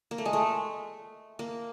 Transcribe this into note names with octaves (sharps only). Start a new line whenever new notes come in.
A#3
A3
G#3
A3
A#3